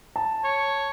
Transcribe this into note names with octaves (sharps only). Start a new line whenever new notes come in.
A5
C#5